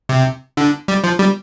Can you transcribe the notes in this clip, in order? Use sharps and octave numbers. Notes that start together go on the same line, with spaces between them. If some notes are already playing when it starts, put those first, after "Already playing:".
C3
D3
G3
F3
G3